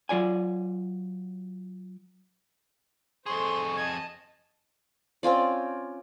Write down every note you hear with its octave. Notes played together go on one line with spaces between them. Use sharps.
F#3 F4 D5 G#5
F2 G#4 A4 C5 C6 C#6
D#5 A5 G#6
C4 C#4 F4 D5